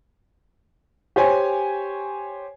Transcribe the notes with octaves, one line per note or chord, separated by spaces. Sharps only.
G4 C5 C#5 G#5